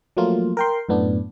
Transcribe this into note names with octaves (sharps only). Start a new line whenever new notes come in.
F3 F#3 A3 A#3 F4
A#4 G5 C6
F#2 A2 B3 D4